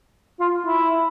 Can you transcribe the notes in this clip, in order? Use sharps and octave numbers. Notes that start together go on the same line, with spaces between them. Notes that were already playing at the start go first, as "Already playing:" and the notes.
F4
E4